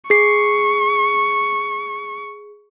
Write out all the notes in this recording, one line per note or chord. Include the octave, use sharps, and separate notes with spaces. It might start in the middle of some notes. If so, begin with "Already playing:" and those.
G#4 C#6 C7